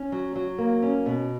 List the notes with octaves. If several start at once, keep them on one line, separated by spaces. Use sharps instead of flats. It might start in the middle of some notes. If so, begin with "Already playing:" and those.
Already playing: C#4
F#3
F#3
A#3
C#4
B2